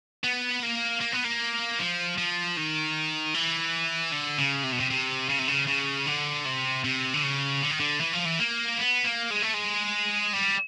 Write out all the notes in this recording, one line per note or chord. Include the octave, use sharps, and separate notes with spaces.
B3
A#3
A#3
B3
A#3
F3
F3
D#3
E3
D3
C#3
C3
B2
C3
C3
C#3
C3
C#3
C#3
D3
C3
C3
D3
C#3
D3
D#3
D3
E3
F3
E3
A#3
B3
A#3
G#3
A3
G#3
G3